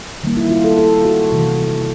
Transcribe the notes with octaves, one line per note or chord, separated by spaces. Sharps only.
D#3 G3 A#3
E4
F4
A4
A4
F#4
C3 E3 G#3